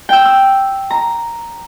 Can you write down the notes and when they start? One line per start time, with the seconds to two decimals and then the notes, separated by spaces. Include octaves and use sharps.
0.09 G5 E6
0.25 E6
0.90 A#5